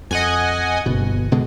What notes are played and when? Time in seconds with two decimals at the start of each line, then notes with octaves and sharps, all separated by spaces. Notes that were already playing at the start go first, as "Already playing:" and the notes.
0.11 F2 D#5 F#5 G#5
0.86 G1 B2
1.32 B2 D3 G#3